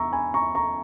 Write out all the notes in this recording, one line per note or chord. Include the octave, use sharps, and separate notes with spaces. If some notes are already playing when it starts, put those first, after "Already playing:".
Already playing: E2 A#5 C#6 E6
G#5 B5
A#5 C#6
A#5 C#6